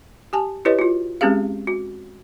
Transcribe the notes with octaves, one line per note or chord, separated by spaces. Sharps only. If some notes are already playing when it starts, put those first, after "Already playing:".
G4 G#5 A5
E4 G4 B4 C#5 D#5
F4 F#4
G#3 C4 C#4 G4 G#4 F5
F#4